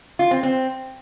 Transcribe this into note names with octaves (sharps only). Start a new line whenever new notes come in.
F4
C4
C4